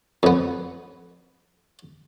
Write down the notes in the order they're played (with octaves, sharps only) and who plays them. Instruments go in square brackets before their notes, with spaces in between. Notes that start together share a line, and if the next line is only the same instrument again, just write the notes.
[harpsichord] F2 B3